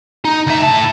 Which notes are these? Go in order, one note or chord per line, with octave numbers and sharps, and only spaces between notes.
D#4
D2 E5
A2 A5